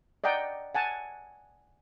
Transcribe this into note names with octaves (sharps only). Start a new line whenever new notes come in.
D5 D#5 F#5 G5 A#5
F#5 G#5 A5